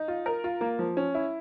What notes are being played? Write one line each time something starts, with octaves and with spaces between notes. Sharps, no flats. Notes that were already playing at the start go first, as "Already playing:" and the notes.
Already playing: D#4
F4
A#4
F4
A#3
F3
C#4
E4